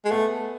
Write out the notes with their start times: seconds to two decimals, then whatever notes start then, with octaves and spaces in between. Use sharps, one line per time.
0.05 G#3
0.11 A3 B3